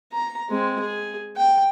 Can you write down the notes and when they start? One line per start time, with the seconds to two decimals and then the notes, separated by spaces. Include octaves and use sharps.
0.13 A#5
0.49 G#3 C4
0.80 G#4
1.36 G5